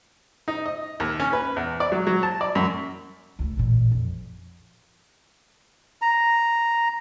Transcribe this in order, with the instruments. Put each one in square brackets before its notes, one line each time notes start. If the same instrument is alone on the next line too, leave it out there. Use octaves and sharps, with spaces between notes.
[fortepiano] D#4
D#5
D#2
C#4
B4
E2
D5
F#3
F#3
A5
D5
F#2
[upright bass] C#2 A3
A1 A#2
F2
[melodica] A#5